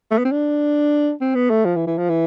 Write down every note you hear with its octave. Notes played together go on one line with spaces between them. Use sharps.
A3
B3
C4
D4
C4
B3
A3
F3
E3
E3
F3
E3